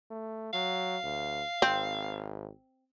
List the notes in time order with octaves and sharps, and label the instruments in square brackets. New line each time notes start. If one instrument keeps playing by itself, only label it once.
[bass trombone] A3
[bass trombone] F#3 [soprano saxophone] F5
[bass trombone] D2
[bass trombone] G#1 [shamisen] C4